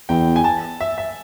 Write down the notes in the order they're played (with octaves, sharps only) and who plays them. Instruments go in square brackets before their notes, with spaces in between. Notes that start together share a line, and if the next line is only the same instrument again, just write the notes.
[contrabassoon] E2 [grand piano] G5
[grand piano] G#5
A5
E5
E5